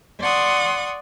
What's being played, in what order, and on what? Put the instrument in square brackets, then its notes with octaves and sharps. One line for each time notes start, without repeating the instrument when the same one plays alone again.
[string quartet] D5 F#5 C6 C#6 D#6